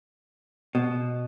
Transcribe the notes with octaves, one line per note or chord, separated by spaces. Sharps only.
B2